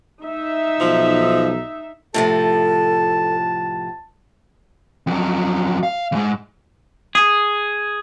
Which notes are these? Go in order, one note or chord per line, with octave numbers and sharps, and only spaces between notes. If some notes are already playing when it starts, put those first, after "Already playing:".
D#4 E5
B1 F3
A2 C3 F3 A4 A5
F2 F#3
F5
E2 G#2
G#4